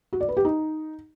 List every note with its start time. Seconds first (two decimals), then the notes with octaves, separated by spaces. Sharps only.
0.13 F#4
0.21 D5
0.29 B4
0.37 G4
0.45 D#4